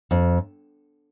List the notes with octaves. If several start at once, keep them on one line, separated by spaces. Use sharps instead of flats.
F2